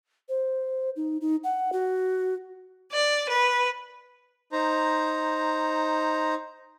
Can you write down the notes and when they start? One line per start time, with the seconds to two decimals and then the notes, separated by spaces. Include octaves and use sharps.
0.29 C5
0.96 D#4
1.21 D#4
1.44 F#5
1.73 F#4
2.91 D5
3.28 B4
4.52 D#4 C5 A#5